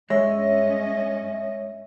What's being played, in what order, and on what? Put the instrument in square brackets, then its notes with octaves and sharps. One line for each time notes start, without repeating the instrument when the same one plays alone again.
[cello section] G2 C#4 D#5 [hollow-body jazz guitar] G#3 [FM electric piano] C#5 E5